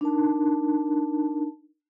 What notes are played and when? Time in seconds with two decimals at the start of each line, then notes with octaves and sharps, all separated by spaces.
0.01 D4 D#4 A#4 A5